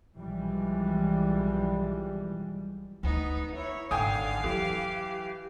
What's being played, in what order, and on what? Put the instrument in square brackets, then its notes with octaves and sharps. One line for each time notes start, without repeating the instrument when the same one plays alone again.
[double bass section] B1 E3 F3 G3 G#3
[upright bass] D2 A#3 [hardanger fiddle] B3 D#4
[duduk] E4 [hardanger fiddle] C#5
[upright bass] G#1 [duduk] D3 [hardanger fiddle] F5 [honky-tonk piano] G5 G#5 D#6
[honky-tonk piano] E3 [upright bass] F#3 [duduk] G4